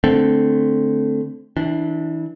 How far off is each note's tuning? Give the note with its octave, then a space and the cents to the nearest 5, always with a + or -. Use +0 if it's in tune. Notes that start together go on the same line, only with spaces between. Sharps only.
D3 +0 A3 +0 C4 +0
E3 -25 D4 +0